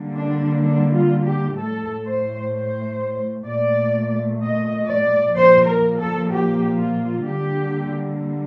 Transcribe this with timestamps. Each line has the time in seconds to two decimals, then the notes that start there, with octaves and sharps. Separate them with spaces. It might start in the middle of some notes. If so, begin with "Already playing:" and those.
Already playing: D3 G3 A#3
0.15 D4
0.63 D4
0.95 F4
1.26 G4
1.57 A2 A3 A4
2.05 C5
2.52 C5
3.47 A#2 A3 D5
4.41 D#5
4.88 D5
5.35 A#2 F3 A#3 C5
5.66 A#4
5.98 A4
6.30 G4
6.77 F4
7.24 D3 G3 A#3 G4